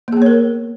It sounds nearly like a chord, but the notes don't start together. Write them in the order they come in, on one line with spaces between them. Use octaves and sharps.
A#3 G#4 B3 C#5 A#4